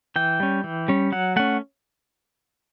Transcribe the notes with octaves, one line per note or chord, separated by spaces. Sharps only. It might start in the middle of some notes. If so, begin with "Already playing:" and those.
E3 G5
G3 C#4
E3
G3 C#4
F#3 F#5
A3 C#4 F#5